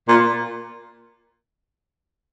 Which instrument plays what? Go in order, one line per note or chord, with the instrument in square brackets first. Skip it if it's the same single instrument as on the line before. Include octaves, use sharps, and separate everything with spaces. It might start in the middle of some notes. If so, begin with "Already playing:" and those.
[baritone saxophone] A#2